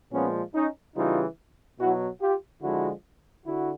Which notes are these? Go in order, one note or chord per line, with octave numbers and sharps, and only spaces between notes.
A#2 F3 G#3 B3 C#4
C#4 D#4
C#3 E3 G3 D#4 F4
B2 F#3 E4 F#4
F4 G4
D3 F3 G#3 E4 F#4
D3 E4 F#4